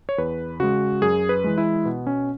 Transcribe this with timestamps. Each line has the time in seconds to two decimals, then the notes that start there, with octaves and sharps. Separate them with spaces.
0.09 C#5
0.18 E2 B4
0.60 C#3 G#3 F#4
1.02 F#2 G#4
1.29 B4
1.44 E3 G#3
1.58 E4
1.85 B2 B3
2.07 C#4